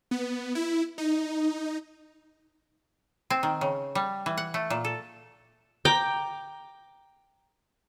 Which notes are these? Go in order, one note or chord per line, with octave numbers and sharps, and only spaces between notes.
B3
E4
D#4
C4
D#3
C#3
G3
E3
F#5
A3
A#2
A4
G5 A#5 D6